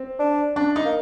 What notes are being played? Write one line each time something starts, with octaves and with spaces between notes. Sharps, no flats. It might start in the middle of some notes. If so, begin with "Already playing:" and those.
Already playing: C4
D4
D4
D#4
A#3